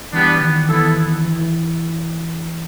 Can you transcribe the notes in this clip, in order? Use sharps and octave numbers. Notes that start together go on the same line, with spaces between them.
E3 G3 B3 D4
D#3
E3 B3 E4 A4
E3